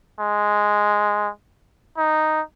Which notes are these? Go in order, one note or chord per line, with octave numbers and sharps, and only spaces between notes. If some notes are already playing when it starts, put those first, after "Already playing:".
G#3
D#4